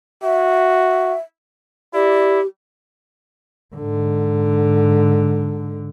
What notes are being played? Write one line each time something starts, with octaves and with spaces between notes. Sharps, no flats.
F#4 E5
E4 G4 D5
G#2 D3